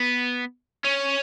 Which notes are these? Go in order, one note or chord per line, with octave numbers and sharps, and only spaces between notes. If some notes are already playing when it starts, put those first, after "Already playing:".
Already playing: B3
C#4